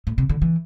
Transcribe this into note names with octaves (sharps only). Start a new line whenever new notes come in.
A2
C3
D3
E3